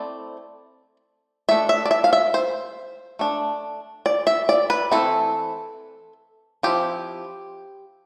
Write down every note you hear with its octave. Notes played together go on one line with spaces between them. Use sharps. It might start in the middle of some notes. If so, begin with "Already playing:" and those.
Already playing: A3 C4 E4 D5
A3 D4 E5
E5
D5
E5
F5
E5
C5
A3 D4
D5
E5
D5
B4
E3 A3 C4 E4 A4
F3 C4 E4 G4